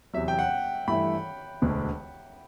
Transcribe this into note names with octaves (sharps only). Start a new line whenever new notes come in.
E2 C3 F#3 E5
G5
F#5
G2 E3 A3 E4 B5
E1 D2 D3